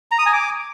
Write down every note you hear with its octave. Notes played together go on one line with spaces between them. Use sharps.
A#5
D#6
G#5
D6